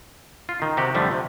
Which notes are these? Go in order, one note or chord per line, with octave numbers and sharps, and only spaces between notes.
F4
D#3
C3 F#4 G4
F2 D3 F3 G3 A3
C3